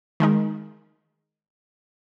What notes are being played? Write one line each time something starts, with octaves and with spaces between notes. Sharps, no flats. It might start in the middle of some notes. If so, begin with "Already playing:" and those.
D#3 G#3 D#4 A#4